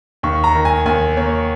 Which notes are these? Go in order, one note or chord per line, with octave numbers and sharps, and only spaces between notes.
D#2 C#6
A#5
D#3
G#5
D#2 G#5
A#3 C#5